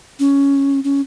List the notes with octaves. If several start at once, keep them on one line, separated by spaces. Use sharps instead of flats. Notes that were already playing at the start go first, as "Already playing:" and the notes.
C#4
C#4